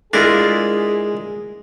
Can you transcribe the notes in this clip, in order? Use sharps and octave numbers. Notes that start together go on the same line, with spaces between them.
G#3 D4 E4 F4 G#4 A#4